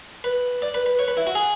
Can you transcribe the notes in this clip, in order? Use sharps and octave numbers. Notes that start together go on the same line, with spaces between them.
B4
D5
B4
B4
C#5
B4
E4
F#4
G#4